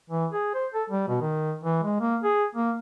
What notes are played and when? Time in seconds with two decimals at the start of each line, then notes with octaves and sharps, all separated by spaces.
0.10 E3
0.32 G#4
0.54 C5
0.74 A4
0.90 G3
1.08 B2
1.21 D#3
1.64 E3
1.83 G#3
2.00 A#3
2.24 G#4
2.55 A#3